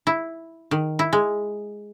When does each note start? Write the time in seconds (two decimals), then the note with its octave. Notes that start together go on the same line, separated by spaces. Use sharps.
0.07 E4
0.71 D#3
0.99 E4
1.13 G#3